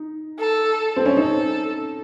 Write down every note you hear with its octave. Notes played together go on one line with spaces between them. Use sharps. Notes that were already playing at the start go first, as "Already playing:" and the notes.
Already playing: D#4
A4
C4
C#4
D#4 A4